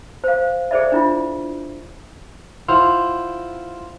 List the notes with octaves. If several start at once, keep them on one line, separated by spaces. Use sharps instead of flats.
C5 F5
G#4 A4 C5 D5 E5
D4 E4 F4
E4 F4 C5 F5 F#5